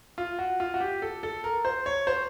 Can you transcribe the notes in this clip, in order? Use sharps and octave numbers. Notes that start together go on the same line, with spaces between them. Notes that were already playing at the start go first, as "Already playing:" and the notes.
F4
F#4
F4
F#4
G4
A4
A4
A#4
C5
C#5
C5